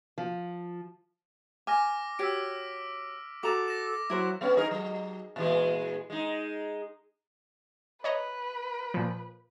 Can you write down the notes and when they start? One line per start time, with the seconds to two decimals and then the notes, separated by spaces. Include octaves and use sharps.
0.18 F3
1.67 G#5 D6 F6 A#6
2.19 F#4 G4 C#5 E6 B6 D7
3.43 F#4 A4 A#5 D6 E7
3.68 A#6 E7
4.10 F#3 E4 A#4 C5
4.41 G3 B3 C#4
4.57 D#4 G#4 A#4
4.71 F#3
5.36 A#2 E3 G#3
6.10 G#3 D#4
8.04 B4 C#5 D#5 A#5
8.94 A#2 F3